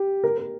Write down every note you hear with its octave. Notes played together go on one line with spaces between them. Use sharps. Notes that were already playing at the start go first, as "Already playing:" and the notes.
Already playing: G4
A#4
A#4